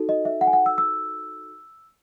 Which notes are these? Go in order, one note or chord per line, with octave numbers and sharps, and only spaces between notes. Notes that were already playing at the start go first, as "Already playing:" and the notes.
Already playing: D#4 F#4 A4
D#5
E5
F#5
G#5
F#5
E6
E6